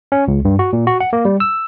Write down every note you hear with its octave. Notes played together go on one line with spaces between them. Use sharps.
C#4
C#2
G2
F#4
A#2
F#4
F#5
A#3
G3
E6